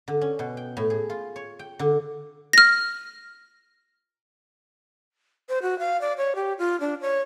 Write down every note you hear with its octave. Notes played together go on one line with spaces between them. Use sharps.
D3
C#4
B2
G5
A2
G#4
F4
C#5
G5
D3
F6 A#6
C5
F#4
F5
D5
C#5
G4
F4
D4
C#5